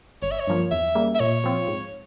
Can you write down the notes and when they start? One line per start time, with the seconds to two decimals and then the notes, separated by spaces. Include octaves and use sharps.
0.22 G1 C#5
0.31 E5
0.40 C#5
0.47 G2 F3 A#3
0.71 E2 E5
0.95 C#3 G3 A#3
1.15 E5
1.20 A#2 C#5
1.44 F3 C4 F4
1.68 G#2